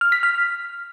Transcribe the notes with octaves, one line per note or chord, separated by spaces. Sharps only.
F6
B6
F6